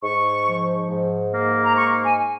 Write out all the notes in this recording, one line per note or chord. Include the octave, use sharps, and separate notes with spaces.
G#2 C#6
F3
G#2
A#3
A#5
G#2 C#6
G#5